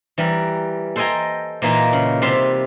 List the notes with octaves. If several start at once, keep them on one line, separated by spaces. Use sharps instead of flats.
E3 G3 A#4
A4 C5 D#5 G5 G#5 A#5
A#2 E3 A#3 D#4 G#5
C#3
C3 G3 F4 C5 E5 C6